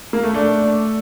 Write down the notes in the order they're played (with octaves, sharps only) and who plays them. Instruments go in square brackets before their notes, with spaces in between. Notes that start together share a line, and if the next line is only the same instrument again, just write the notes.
[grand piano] A#3
A3
[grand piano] A3 [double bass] D4